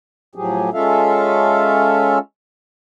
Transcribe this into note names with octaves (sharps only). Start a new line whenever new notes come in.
A2 F3 F#3 G4 G#4
G#3 C#4 F4 A4 E5 F5